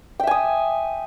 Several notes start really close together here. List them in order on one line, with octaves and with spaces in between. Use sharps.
G5 E5 G#5 D#6